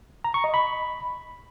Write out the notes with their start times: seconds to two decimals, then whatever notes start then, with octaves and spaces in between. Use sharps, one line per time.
0.24 A#5
0.34 C#6
0.44 D#5
0.54 B5